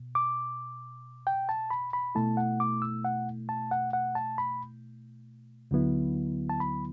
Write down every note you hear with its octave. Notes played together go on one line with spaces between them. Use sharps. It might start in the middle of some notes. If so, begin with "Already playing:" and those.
Already playing: B2
D6
G5
A5
B5
B5
B2 A3 E4 A5
F#5
D6
E6
F#5
A5
F#5
F#5
A5
B5
D2 D3 F#3 B3 E4
A5
B5